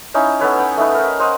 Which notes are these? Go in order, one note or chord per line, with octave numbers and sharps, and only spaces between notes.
C#4 D#4 E4
B3 A4 B4 C#5
F#5 G5
A3 D#4 B4
A#4
C5 D#5 F5 F#5